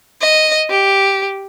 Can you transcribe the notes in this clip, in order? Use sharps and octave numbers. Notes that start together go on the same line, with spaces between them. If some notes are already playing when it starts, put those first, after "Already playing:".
D#5
G4